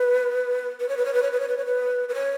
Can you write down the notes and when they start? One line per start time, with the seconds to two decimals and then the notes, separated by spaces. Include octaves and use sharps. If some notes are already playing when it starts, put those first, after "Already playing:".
Already playing: B4
0.80 B4
0.89 C#5
0.97 B4
1.05 C#5
1.14 B4
1.23 C#5
1.32 B4
1.40 C#5
1.48 B4
1.57 C#5
1.65 B4
2.09 B4
2.15 C#5